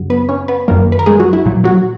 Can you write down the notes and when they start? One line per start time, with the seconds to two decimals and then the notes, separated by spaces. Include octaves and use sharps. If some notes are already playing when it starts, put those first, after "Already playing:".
Already playing: F#2 C#3 F#3
0.10 B3 B4
0.29 C#4 C#5
0.48 B3 B4
0.68 F#2 D#3 F#3 A#3 A#4
0.92 B4
0.99 A#4
1.06 G#3 G#4
1.20 F#3 F#4
1.33 E4
1.46 A#2 F#3
1.64 F#3 F#4